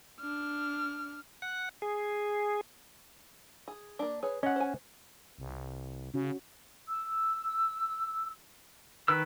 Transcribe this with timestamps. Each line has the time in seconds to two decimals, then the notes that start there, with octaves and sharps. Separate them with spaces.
0.20 D4 F6
1.42 F#5
1.82 G#4
3.68 G#4
3.99 A#3 D4
4.23 G#4 B4 C#5
4.43 C#4 D#5 F#5
4.56 C5 G#5
5.38 C2
6.14 C#3 C#4 F#4
6.86 E6
9.08 D#3 B4 E6